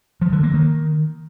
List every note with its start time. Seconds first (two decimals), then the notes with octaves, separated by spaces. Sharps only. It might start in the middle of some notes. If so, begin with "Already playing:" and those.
0.22 F3
0.32 D3
0.43 A#3
0.54 D#3